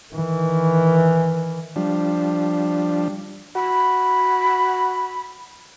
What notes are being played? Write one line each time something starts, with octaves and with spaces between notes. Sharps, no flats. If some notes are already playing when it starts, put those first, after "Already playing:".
D#3 E3
F3 G3 D4
F#4 B5